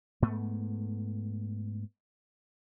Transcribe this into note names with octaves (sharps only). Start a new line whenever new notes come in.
G#2 A3 B3